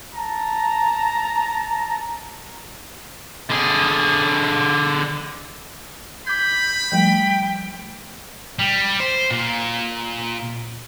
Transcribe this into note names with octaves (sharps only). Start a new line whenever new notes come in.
A5 A#5
D3 G#4
B5 D6 G6 G#6
F3 G3 A3 G5
G3
C5
A#2